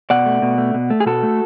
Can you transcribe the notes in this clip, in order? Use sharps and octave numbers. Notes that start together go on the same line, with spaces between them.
B2 D5 F#5
A3
B2
A3
B2
A3
G#4
B2 F#4 A4
A3